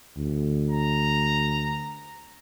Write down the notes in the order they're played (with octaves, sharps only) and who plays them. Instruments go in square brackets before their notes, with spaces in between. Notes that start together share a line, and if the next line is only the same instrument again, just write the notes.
[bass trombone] D2
[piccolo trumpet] A#5